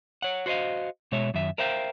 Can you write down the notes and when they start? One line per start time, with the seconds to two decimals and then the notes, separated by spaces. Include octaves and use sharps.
0.22 C#5 F#5
0.46 F#4 C5 C#5 D#5 F5
1.12 B2 G#3 C#5 E5
1.34 F#2 D#3 E5
1.58 A#4 C5 E5 F5 G5